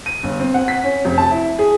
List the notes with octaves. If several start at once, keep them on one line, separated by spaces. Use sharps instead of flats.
D#7
G1
C4
F#5
B6
C#4
F1
A5
E4
G#4